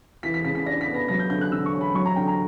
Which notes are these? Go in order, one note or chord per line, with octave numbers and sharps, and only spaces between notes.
E3 B6
B6
C#3 B6
B6
D4 A#6
B6
B3
A#6
F#3 A#6
G6
D3 G6
F#6
D3 E6
C#6
C#4
B5
F#3 C#6
A#5
D3 G5
A#5